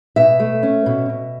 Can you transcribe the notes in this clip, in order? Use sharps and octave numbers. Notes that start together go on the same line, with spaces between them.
B2 E5
A3
C#4
B2
B2